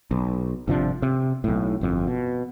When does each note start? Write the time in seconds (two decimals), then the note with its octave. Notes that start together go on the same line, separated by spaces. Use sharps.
0.11 B1
0.68 G1 C3 F3 D4
1.02 C3
1.44 B1 A2
1.81 G1 F2
2.07 B2